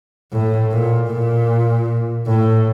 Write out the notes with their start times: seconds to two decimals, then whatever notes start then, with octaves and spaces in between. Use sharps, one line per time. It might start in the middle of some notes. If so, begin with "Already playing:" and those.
0.32 A2
0.72 A#2
1.10 A#2
2.27 A2